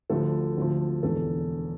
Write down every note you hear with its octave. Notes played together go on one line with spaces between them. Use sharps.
D2 D3 F3 A4
D2 D3 F3
E1 E2 D3 A4